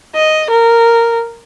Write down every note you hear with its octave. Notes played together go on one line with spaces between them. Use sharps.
D#5
A#4